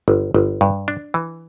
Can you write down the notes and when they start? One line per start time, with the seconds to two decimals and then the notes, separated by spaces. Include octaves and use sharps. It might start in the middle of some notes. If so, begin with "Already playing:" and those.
0.08 G1
0.34 G1
0.61 G2
0.88 D4
1.14 E3